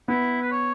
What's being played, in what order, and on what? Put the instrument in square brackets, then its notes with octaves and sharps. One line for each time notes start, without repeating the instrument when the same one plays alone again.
[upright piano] B3 [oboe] E4
[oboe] B4
C#5